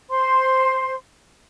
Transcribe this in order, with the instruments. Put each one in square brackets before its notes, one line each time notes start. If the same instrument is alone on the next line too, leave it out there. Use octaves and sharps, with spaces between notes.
[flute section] C5 C6